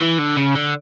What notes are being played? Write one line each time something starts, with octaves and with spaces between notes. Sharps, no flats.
E3
D3
C#3
D3